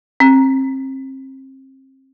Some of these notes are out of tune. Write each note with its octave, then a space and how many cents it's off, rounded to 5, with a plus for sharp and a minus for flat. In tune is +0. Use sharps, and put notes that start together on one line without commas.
C4 +30